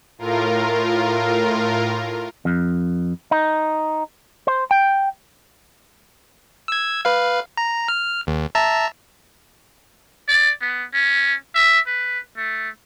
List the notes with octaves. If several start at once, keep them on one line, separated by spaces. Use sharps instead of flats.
A2 F4 A#4
F2
D#4
C5
G5
E6 G#6
B4 F5
A#5
F6
D#2
E5 A5 A#5
D5
B3
C#4
E5
B4
A3